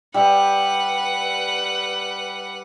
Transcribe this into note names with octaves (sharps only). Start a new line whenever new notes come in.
G3 B4 E5 F#5